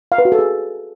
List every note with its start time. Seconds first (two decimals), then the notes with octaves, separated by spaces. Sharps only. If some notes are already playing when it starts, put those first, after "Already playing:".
0.12 F5
0.18 B4
0.25 F#4
0.32 A4
0.39 G#4